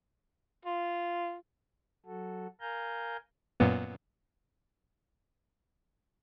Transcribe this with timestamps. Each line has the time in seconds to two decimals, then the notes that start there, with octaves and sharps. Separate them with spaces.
0.65 F4
2.06 F#3 F#4 A4
2.61 A#4 F5 G#5 A#5 G6
3.60 F#2 A#2 B3